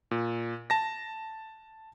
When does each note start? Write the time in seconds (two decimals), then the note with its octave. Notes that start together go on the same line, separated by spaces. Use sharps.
0.11 A#2
0.70 A5 A#6